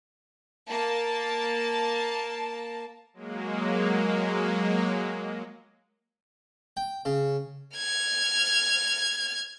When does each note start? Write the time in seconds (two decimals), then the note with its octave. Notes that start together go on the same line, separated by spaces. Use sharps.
0.68 A#3 A5
3.14 F#3 G#3 A#3
6.77 G5
7.05 C#3
7.77 F6 G#6